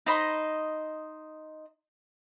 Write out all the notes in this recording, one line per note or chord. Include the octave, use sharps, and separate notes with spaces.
D#4 C5 D#5 B5